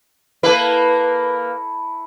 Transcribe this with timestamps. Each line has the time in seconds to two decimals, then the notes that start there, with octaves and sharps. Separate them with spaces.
0.43 A#3 E4 A4 B4